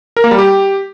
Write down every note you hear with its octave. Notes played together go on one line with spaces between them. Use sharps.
A#4
A#3
G3
G4